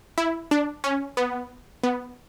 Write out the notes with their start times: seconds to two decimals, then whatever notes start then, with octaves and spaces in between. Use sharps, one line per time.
0.18 E4
0.51 D4
0.84 C#4
1.17 B3
1.84 B3